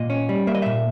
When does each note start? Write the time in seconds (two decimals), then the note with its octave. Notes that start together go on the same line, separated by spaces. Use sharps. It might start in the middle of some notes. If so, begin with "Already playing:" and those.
Already playing: A#2 D#5
0.10 C#4
0.29 G3
0.47 A#3 E5
0.55 D#5
0.62 A#2 E5